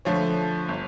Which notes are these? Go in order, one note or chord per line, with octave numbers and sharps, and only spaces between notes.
D3 F3 A3 C#5
G1